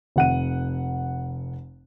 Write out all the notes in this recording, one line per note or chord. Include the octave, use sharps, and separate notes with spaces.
F1 F#5 D#7